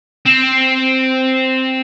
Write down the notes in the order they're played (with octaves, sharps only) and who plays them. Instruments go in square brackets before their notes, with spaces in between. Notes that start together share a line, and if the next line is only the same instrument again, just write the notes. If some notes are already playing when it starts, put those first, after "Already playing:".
[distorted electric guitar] C4